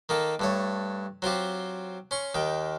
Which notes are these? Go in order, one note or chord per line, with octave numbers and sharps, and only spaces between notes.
D#3 A#3 A4
G2 A3 C#5
F#3 C4 F4 G4
C#4 C6 C#6
D#2 D#3 G5